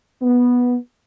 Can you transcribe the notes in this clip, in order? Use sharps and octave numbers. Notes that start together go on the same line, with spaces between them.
B3